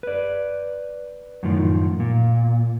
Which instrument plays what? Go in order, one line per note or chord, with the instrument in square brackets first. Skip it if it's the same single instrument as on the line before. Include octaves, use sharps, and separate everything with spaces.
[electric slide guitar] B4 D5
F#2 A2 D#3 F3
A#2